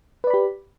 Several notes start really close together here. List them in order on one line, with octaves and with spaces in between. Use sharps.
B4 D5 B5 G4